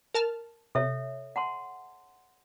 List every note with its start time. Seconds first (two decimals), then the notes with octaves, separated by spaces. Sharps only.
0.14 A#4 A5 F6
0.75 C3 A4 C#5 E5
1.36 F#5 A5 C6